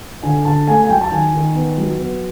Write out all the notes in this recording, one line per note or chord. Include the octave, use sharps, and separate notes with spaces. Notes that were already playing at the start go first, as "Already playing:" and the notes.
D3 G#5
D3 A5
A3 G#5
G#5
F#3 G5
A5
D#3 G#5
D#3
B3
F#3
B3